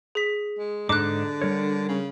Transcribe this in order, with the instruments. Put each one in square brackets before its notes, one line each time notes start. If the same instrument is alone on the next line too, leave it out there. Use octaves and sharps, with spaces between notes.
[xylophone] G#4 B6
[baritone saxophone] G#3
[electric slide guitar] G#2 D4 D#4 [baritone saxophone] D3 [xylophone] D6 F#6
[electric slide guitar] G3 A#4 C#5
[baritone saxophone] C#3